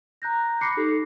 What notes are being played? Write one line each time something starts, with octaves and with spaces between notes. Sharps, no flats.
A#5 F#6 G6 A#6
B5 D6 F#6 A#6 C7 C#7
D#4 G4 A4 C7